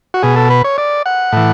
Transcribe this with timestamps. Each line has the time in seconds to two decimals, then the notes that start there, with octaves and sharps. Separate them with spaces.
0.14 F#4
0.23 B2 G#4
0.36 A4
0.50 B4
0.64 C#5
0.78 D5
1.06 F#5
1.32 A2 E3